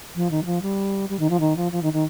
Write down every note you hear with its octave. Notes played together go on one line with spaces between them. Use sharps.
F3
D#3
G3
F3
G3
G3
D#3
F3
D#3
F3
F3
D#3
D#3